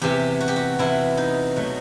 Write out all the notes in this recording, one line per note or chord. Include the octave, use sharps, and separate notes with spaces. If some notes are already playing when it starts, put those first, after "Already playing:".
E2 C3 E3 G4
F#4
G4
F#4
E2 C3 E3 E4
D#4
B2 F#3 A3